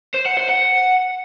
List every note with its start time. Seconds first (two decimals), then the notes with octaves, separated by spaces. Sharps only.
0.14 C5
0.26 F#5
0.37 C5
0.49 F#5